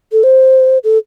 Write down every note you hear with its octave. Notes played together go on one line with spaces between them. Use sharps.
A4
C5
A4